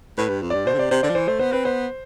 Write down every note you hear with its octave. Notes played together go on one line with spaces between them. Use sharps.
A2 B4
G2
F2
G2 D5
B2 C5
D3
C3 D5
C3 C5
D3 D5
F3
E3 C5
A3 C5
B3 C5
C4 B4
B3 C5